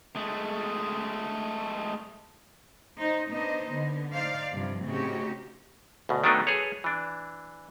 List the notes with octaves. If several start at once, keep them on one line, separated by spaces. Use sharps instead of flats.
G#3 A3
D#4 C5
B3 D4 D#4 C5 D#5
D3 B3
D#4 C5 D5 F5
G2 C3 F3
A2 C#3 C4 D#4 F#4 G4
D2 B2
D#3 F#3 A3 B3 D4 D#4
G#4 A4 B4 C#5
E3 D4